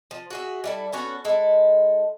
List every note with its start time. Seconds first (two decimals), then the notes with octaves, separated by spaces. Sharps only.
0.11 F3
0.31 F#4 G#4 E5
0.64 G3 E4 A4
0.93 B3 C#4 F#4 A4
1.25 G#3 E4 A4